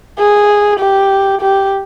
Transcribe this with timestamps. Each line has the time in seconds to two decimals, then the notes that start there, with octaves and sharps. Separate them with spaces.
0.18 G#4
0.80 G4
1.41 G4